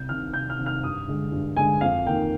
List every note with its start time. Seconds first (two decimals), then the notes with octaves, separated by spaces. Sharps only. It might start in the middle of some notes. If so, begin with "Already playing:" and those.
Already playing: C2 G6
0.09 C3 D#3 F6
0.34 C2 G6
0.50 F6
0.58 C3 D#3
0.66 F6
0.83 G2 D#6
1.08 D3 G#3
1.32 G2
1.56 D3 G#3 G#5
1.81 F2 F5
2.05 D#3 A#3 G5